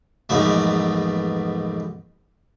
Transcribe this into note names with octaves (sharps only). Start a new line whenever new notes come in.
A#1 E2 G#2 B2 A3